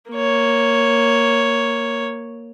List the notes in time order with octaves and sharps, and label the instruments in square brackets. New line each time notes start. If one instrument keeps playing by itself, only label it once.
[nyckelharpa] A#3 C#5